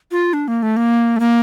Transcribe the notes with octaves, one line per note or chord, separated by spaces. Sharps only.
F4
D4
A#3
A3
A#3
A3
A#3